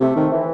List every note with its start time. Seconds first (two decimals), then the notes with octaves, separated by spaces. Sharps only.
0.01 C3 A3
0.16 D#3 C4
0.32 E3